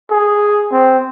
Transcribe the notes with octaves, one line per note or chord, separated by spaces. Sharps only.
G#4
C4